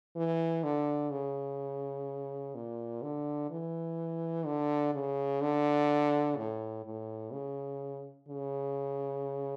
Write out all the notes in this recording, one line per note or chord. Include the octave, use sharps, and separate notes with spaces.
E3
D3
C#3
A#2
D3
E3
D3
C#3
D3
A2
A2
C#3
C#3